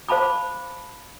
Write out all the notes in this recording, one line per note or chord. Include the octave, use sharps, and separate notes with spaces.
C5 F5 A5 B5 D6